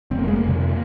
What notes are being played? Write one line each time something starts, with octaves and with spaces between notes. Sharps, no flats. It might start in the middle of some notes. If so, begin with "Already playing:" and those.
F1 C4
A#3
G#3
A#3
F2 C3